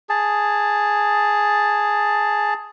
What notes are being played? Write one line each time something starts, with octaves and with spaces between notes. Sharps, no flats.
G#4 A5